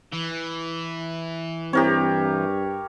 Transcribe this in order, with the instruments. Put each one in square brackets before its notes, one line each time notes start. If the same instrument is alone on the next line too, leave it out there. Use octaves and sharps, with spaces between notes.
[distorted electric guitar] E3
[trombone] G2 [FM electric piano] C4 E4 A#5 [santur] G4 A#4 C#5